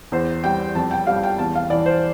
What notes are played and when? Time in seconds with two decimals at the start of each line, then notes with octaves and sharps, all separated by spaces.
0.12 E2 C5
0.44 G3 G5
0.75 F2 A5
0.91 G5
1.07 G3 F5
1.23 G5
1.39 E2 A5
1.55 F5
1.70 E3 D5
1.86 C5